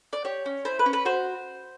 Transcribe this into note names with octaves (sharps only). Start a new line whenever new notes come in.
D5
G4 C#5
C#4
E4 C5
B4
C#4
B4
F#4 C5